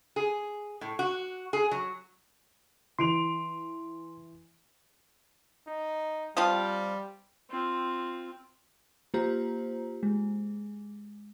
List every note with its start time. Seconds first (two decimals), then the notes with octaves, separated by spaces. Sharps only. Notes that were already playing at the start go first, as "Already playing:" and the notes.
0.16 G#4
0.81 A2
0.99 F#4
1.53 G#4
1.71 F#3
2.99 E3 C6 D7 F7
5.68 D#4
6.37 F3 G3 C4 F4
7.50 C4 F4
9.14 A#3 F4 G4 C5 A#5
10.03 G#3